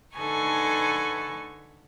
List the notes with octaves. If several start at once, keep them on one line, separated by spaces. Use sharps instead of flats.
D3 D#4 A4 B4 G#5 C#6